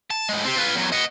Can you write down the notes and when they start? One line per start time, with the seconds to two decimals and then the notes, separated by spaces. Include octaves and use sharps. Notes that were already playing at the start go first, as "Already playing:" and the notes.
0.11 A5
0.29 A2 G#3
0.45 C4 G4
0.57 F4 B4
0.76 E2 F#3
0.92 D#5 F#5